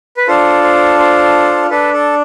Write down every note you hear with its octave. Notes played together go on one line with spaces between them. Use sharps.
B4
D4 F4 A4 C5
C5
C5
D4 A4 B4
A4